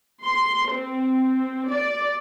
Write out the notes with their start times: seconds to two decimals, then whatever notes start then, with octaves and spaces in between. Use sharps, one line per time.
0.22 C6
0.69 C4
1.68 D5